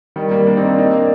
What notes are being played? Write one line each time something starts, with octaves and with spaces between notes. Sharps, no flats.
D#3 G3
G3 A#3
A#3 D4
C4 D#4
A#3 D4
C4 D#4
A#3 D4